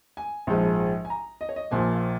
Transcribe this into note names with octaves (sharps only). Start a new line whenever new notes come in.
G#5
A#1 G#2 F3 G#3
G#5
A#5
D#5
C#5
D#5
A#1 A#2 F3 A#3 G#5
F5